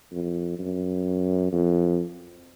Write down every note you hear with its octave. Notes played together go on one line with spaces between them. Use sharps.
F2
F#2
F2